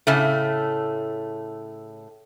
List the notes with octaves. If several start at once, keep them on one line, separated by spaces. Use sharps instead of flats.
A2 C#3 A3